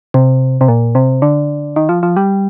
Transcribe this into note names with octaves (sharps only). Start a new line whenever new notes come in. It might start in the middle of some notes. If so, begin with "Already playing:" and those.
C3
C3
A#2
C3
D3
D#3
F3
F3
G3